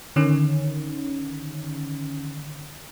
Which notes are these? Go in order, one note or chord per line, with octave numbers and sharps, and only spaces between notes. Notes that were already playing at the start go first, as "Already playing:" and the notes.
D3 D#3 C#4